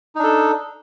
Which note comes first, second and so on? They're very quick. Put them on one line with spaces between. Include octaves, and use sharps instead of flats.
D#4 D4 A4